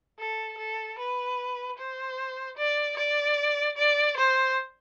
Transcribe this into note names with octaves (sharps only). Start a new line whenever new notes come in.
A4
A4
B4
C5
D5
D5
D5
C5